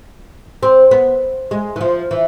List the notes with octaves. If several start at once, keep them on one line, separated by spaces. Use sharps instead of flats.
C4
B3
G#3
E3
F3
E3